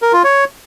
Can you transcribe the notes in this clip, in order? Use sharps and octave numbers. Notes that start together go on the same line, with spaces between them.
A#4
F4
C#5